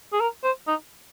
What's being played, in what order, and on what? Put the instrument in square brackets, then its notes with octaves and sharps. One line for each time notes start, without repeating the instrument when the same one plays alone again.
[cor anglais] G#4
A#4
C5
D#4